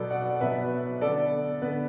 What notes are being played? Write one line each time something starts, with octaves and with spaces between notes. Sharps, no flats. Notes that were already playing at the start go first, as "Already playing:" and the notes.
Already playing: B2 F#3 B3 A4 D5
D5 F#5
B2 F#3 B3 B4 E5
D3 B3 A4 D5
D3 B3 B4